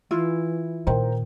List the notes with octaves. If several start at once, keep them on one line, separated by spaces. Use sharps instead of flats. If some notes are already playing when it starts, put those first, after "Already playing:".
E3 E4 F4
A#2 D#3 A#4 C5 G5